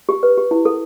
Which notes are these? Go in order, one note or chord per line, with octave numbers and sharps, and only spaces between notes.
G4
B4
G4
E4
A4